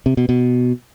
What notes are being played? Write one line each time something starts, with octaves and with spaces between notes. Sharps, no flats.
C3
B2
B2